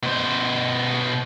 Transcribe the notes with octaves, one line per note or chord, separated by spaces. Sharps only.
B2 C5